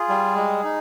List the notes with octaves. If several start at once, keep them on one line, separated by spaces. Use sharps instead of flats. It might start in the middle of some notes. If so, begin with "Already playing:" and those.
Already playing: F4 G#4
G3
G#3
D#4